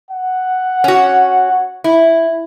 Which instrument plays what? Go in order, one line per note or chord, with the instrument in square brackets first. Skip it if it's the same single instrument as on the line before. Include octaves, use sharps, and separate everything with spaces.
[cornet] F#5
[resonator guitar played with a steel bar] C#4 F#4
E4